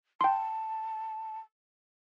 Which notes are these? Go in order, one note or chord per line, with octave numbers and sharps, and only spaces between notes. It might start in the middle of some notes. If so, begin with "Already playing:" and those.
G5 A5 C6